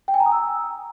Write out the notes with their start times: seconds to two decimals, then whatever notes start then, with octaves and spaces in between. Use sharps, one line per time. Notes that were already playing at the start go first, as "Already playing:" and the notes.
0.08 G5
0.14 G#5
0.20 A#5
0.26 D#6
0.32 E6